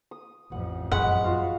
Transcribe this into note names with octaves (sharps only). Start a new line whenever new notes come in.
D#6
A1 F2 F#5
F#2 A#2 G#3 F#5 B5 C#6
F4 F#4 F5